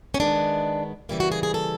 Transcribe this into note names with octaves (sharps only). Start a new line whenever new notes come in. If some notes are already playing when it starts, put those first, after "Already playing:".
C#4
D#3 G#3 B3 D4
C#3 E3 G3 A#3 E4
F#4
G#4
G#4
A4